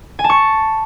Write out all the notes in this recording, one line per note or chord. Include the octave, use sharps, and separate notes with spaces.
G#5
A5
C#6